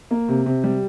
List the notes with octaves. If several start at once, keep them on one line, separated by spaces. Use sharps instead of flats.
A#3
C3
C3
G3